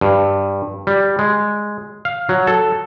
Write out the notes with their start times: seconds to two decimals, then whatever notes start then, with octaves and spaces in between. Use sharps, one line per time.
0.01 G2
0.87 G3
1.19 G#3
2.05 F5
2.29 F#3
2.47 A4